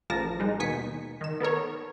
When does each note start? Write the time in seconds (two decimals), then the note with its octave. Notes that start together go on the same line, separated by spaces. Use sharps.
0.10 A1 F3 A#4 A5 A#6
0.39 G3 G#3 D#4
0.59 D#2 B2 D#4 G#5 B6 C#7
1.21 D#3 E7
1.40 B3 A4 A#4 C#5